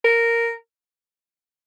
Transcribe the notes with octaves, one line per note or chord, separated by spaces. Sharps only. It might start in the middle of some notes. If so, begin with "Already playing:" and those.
A#4